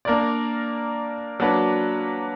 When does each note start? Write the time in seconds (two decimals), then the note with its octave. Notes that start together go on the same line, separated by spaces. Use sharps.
0.05 A#3 D4 A#4 D5
1.40 F#3 A#3 D4 F#4 B4